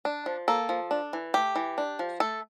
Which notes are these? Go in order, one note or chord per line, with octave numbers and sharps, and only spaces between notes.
D4
F3
A#3 A4
F3
D4
E3
A3 G4
E3
D4
F3
A3 A4